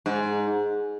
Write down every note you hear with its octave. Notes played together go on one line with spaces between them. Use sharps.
G#2